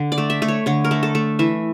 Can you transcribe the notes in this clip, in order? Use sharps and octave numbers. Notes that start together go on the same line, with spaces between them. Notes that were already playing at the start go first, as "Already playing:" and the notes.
Already playing: D3
D5
A3
E5
A3
C#5
D3 C#5
A#4
A3
A4
A3
E3 E5